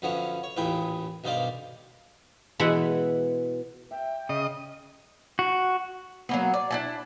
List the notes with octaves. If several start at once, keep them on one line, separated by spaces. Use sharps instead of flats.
F#2 D3 F3 B3 C#4
C#5
A1 D#2 A#2 G#4 B4 G5
B1 G2 D#3 C5 D5 F5
B2 E3 G#3 E5 F#5
E5 G5
C#3 D#5
F#4
F#3 A#3 B3
D5
D4 E4 A5